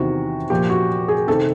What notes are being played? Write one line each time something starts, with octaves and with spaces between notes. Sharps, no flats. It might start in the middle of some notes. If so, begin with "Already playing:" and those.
Already playing: E2 C3 D#3 F#4
A#2 F3 G4
F#4
G#4
C3 D#3 A4